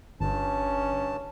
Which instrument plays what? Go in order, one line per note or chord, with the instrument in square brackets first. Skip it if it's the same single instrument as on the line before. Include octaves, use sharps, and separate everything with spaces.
[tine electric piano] G1 [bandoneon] G2 A5 [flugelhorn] C#4